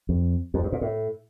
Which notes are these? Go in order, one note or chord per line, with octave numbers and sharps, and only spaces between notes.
F2
F2
G2
A#2
A2